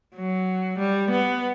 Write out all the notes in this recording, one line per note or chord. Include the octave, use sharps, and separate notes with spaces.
F#3
G3
B3